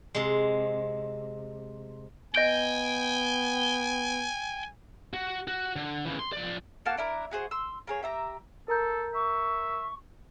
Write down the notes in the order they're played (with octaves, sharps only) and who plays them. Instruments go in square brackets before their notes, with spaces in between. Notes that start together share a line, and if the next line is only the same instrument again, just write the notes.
[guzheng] C3 G#3
[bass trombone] B3 [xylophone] D#5 G6 D7 [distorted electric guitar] G5 [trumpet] G#5
[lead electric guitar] F#4
F#4
D3
C#3 E3
C6
F3 D5
[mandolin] A#3 F#4 A5 F6
D4 E4 A#4
F#4 G#4 C5
C6 E6
A#3 G#4 C#5
G4 E5 A#5
[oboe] A4 [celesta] A#4 A#5 G6
[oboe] E5 [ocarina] C#6